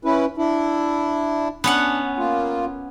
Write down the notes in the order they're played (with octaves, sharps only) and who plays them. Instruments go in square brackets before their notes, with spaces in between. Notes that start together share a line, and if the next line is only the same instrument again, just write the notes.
[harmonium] C#4 E4 B4
D4 E4
[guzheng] B3 C#4 F#5 [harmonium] D4
[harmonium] A#3 F4